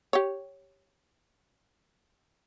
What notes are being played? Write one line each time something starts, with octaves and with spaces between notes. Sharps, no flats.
G4 C#5